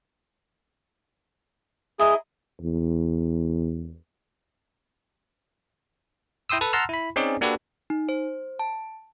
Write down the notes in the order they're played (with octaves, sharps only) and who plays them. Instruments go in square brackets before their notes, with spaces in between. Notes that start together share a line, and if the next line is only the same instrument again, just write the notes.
[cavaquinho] E4 D#5 A#5 [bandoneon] G#4
[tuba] E2
[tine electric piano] E4 G5 C6 D#6 E6
A4 B4
F#5 A5 A#5 C6 E6 F6
E4 B5
C4 C#4 D#4 G#4 D5
A#3 D4 F#4 G4 A4 B4
[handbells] D#4
C5
A5